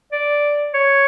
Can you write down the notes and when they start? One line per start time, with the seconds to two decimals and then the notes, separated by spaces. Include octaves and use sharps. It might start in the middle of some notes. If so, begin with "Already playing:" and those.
0.12 D5
0.74 C#5